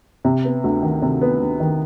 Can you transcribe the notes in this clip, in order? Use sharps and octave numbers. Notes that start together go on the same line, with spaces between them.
C3
B3
D2
D#3
C3
B3
D2
D#3